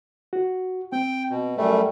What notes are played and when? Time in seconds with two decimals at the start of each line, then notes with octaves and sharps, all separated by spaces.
0.33 F#4
0.92 C4 G5
1.31 B2
1.57 F#2 G3 A3